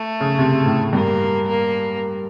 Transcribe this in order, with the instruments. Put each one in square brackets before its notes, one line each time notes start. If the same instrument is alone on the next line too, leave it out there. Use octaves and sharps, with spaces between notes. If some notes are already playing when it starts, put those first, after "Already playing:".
Already playing: [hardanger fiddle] A3
[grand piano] C#3
C3
A2
[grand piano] G2 [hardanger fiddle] A#3
[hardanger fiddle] A#3